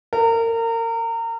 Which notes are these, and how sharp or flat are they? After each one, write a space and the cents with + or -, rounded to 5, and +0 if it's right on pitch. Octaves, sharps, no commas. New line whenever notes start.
A#4 -30